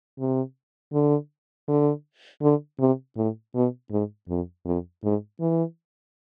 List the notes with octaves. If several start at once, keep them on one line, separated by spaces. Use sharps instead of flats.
C3
D3
D3
D3
C3
A2
B2
G#2
F2
F2
G#2
E3